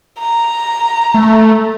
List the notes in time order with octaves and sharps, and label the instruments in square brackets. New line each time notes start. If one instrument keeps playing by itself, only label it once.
[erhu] A#5
[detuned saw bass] A3